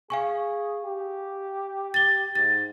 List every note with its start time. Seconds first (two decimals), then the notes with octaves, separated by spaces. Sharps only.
0.10 G#4 F5 G#5 C#6
0.84 G4
1.94 A6 G7
2.35 G#2 A6